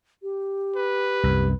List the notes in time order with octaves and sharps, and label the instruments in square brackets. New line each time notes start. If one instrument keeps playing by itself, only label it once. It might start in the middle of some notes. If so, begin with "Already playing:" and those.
[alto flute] G4
[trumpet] B4
[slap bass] C2 F#2